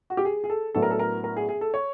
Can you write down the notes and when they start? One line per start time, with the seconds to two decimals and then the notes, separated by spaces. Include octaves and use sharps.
0.10 F#4
0.17 G4
0.25 G#4
0.44 G#4
0.50 A4
0.75 A2 F#3 B3 D4 A4
0.82 A#4
0.91 A4
0.99 A#4
1.24 A#4
1.37 G#4
1.49 G#4
1.61 A4
1.74 C#5